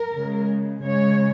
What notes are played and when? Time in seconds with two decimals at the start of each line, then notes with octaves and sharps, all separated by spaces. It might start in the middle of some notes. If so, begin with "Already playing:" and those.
Already playing: A#4
0.12 C#3 G#3
0.83 C#3 G#3 C#5